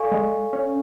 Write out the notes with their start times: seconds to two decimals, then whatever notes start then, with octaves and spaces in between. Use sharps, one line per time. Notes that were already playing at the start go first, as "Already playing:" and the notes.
Already playing: A4 D5 F5 G#5 C#6
0.12 G#3
0.53 C#4